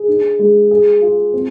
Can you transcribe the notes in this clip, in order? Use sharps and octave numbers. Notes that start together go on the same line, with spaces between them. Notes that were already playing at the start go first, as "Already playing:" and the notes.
Already playing: G#4
D4
G#3
G#4
F4
C4